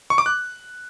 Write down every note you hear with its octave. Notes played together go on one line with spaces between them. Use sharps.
C#6
D6
F#6